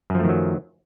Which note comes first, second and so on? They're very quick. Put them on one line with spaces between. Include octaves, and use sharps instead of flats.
F#2 F3 A3 D#3 F#3